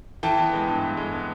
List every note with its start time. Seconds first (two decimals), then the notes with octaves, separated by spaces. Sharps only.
0.23 E3 G5 A5
0.38 B3
0.53 G#3
0.68 G2
0.83 G2
0.97 G#3
1.12 B3